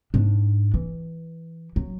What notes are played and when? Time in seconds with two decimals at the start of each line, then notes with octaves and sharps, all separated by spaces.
0.14 G#2 D4
0.74 E3
1.76 F#3